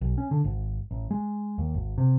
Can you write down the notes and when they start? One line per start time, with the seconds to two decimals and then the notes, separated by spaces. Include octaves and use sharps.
0.01 B1
0.18 C#4
0.31 D3
0.44 G#1
0.91 A1
1.11 G#3
1.58 D#2
1.74 G#1
1.98 C3